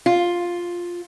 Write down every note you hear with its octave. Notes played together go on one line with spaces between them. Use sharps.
F4